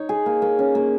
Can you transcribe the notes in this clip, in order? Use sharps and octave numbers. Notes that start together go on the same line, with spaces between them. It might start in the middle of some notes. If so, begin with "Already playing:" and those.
Already playing: D#4 C#5
G#4
A#3
A#3
C#4
A#3